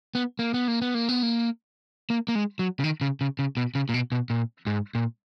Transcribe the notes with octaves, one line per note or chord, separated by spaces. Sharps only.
B3
A#3
B3
A#3
B3
A#3
B3
A#3
A#3
A#3
G#3
F#3
C#3
D#3
C#3
C#3
C#3
B2
C#3
A#2
B2
B2
A#2
G#2
A#2